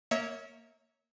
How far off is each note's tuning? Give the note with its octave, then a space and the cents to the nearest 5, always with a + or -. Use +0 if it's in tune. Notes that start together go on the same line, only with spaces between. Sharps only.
A#3 -10 C#5 +0 E5 -30